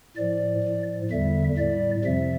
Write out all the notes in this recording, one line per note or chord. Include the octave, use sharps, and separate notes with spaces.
A2 F3 D5
A2 F3
E2 D3 G3 E5
A2 G3 D5
F2 C3 F3 E5